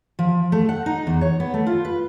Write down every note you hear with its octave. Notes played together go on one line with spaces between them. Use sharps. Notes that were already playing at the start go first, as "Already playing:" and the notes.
F3
A3
F#5
D#4
E2
C#5
B3
A3
F4
B4